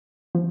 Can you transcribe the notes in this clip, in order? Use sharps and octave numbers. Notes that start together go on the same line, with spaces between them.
F3